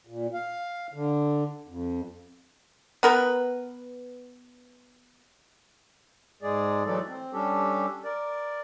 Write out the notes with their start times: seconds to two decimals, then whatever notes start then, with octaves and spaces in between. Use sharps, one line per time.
0.07 A#2
0.34 F5
0.94 D3
1.68 F2
3.03 B3 A#4 B4
6.42 G#2 G#3 G#4 D5
6.85 E3 F#3 G#3 A3 A4 D5
7.08 C4
7.33 G3 C#4 D4 G4 A4
8.04 A#4 D5